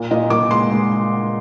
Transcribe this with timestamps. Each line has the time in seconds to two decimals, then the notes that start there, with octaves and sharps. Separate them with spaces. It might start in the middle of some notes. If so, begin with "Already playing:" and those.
Already playing: A#2
0.11 A#2 D#5
0.30 A#2 D6
0.51 G#3 C6
0.71 G#3